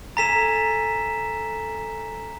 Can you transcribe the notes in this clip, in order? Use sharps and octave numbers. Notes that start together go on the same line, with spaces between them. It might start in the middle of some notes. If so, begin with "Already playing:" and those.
A4 G#5 A#5 A6 B6 E7